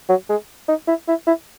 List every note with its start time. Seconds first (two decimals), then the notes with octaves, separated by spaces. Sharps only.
0.09 F#3
0.30 G#3
0.68 D#4
0.88 E4
1.08 E4
1.27 E4